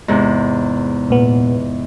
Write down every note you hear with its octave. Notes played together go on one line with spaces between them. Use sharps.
E2 G#2 C3
A#2 B3